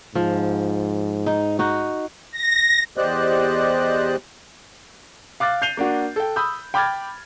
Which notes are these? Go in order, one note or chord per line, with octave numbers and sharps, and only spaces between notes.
G#2 F3
D#4
D#4 F#4
A#6
E2 G4 C5 D5 D#5 F#6
F5 D6 F#6 A6
G6 C7 D#7 F7 G7
A#3 D4 F#4
A4 G5
B5 D#6 E6 G6
G5 B5 D6 F6 G#6 A6